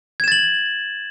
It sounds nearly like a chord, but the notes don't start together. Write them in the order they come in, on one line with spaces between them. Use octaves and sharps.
G#6 E7 A6 F#7